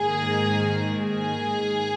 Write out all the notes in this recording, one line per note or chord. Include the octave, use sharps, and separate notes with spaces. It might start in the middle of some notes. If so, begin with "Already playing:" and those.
Already playing: G#2 D#3 A#3 G#4
G#4